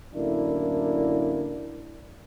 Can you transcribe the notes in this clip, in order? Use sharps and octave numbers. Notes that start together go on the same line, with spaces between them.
F#2 A2 D3 A#3 D4 E4